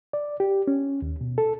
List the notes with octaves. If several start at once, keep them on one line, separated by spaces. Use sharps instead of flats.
D5
G4
C#4
D#2
B2
A4